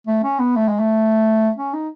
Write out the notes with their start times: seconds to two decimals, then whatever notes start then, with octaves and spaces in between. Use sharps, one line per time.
0.07 A3
0.23 C#4
0.39 B3
0.56 A3
0.68 G#3
0.79 A3
1.56 C#4
1.74 D#4